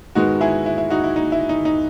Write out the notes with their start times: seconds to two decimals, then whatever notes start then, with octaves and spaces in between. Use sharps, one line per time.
0.15 G#2 D#3 G#3 B3 D#4 F#4
0.41 E4 G#4
0.66 E4
0.78 E4
0.90 D#4 F#4
1.04 E4
1.16 D#4
1.32 E4
1.49 D#4
1.65 D#4